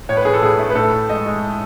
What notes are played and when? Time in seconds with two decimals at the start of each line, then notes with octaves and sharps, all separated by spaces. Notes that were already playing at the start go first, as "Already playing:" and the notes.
0.09 A2 C#5
0.17 B4
0.25 A2 G#4
0.33 A4
0.42 A2 G#4
0.59 A3
0.70 B4
0.75 A2 A4
0.92 A2
1.09 G#3 D#5
1.26 G#3